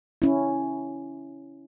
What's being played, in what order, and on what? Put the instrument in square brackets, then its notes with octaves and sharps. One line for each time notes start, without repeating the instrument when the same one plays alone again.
[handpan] C#4 E4